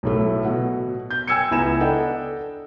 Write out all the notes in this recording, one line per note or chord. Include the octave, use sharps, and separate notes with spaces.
B1 A2 A3
B2 F#5
G6
G5 G#5 E6 G#6 C#7
C#2 B3 E4 G#5 A#5 E7
D4 A4 D#5 F#5 G5